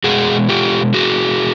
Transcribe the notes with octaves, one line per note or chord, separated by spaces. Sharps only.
B2 G#3 F#4 G#4
F4 G4
F#4 G#4